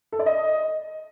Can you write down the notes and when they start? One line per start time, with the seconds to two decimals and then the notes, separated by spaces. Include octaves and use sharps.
0.12 A4
0.19 D5
0.26 D#5